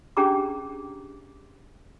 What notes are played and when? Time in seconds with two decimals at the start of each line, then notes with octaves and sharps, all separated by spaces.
0.17 C#4 D4 G4 G#4 A#5 D6